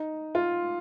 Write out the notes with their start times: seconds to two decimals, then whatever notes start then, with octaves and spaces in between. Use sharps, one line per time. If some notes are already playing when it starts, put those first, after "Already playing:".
Already playing: D#4
0.35 F4